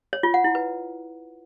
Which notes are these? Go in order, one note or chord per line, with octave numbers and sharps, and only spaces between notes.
C#5
F4
F#5
E4
B4